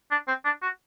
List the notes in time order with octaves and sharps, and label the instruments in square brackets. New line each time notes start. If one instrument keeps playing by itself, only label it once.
[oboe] D4
C4
D4
F#4